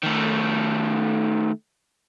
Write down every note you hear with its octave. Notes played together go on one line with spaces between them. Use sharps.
D#3 A3